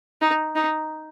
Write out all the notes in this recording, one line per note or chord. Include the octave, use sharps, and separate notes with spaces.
D#4
D#4